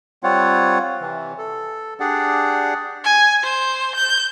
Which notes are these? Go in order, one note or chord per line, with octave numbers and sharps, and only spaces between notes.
G3 C4 F4 C#5 F#5
C3 E3
A4
D4 G4 G#4 D5 F#5
G#5
C5
G6